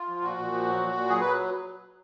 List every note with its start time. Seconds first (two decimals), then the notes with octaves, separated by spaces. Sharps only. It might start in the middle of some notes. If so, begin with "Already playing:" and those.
Already playing: F4
0.08 F3
0.22 A#2 F#4
0.37 A#2
0.52 F3
0.66 F#3
0.80 A#2
0.95 A#2
1.09 F#3 G#4
1.21 F#3 B4